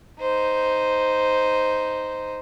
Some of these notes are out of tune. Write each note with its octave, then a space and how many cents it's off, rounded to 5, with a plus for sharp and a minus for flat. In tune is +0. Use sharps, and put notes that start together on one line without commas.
D#4 +0 C5 -5